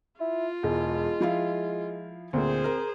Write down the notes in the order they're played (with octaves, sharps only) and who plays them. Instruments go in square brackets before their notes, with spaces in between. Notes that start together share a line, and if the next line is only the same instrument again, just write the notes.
[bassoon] E4 [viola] F4
[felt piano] E1 [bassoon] G#3
[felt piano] F3 E4 F5
[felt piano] D2 A#2 [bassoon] C4 [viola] G#4 C5
[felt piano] A#4 A#5